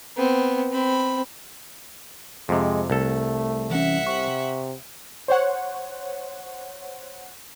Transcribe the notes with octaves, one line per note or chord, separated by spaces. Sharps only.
B3 C4
C4 B5
F2 C3 G#3
C2 A3 A4
E3 C#4 E5 F#5
C3 C#6
C5 C#5 F#5